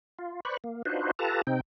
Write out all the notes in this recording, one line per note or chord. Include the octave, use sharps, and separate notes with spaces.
F4
B4 C5 D5 B5 C#6
A#3
D4 D#4 F4 F#4 B4 C5
F4 G4 A4 B4 A5 A#5
C3 C4 D#4 G5